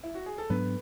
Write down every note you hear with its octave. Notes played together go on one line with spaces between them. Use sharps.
E4
F#4
G#4
A4
G#2 F#3 B3 D4 B4